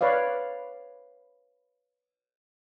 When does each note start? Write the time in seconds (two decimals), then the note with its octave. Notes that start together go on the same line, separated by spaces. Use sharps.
0.01 B4 C#5 D5 F5